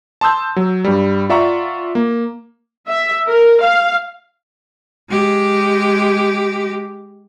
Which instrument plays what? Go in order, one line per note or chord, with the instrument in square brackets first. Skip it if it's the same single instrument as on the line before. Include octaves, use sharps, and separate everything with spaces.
[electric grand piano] A5 C6 D#6 E6 G6
F#3
G2 G3
F4 D5 E5 F#5 A#5 C#6
A#3
[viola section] E5
A#4
F5
[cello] G#3 G4